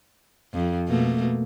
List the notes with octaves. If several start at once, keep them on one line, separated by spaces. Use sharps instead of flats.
F2
B2 A3 A#3